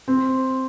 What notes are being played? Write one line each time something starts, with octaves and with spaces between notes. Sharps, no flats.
C4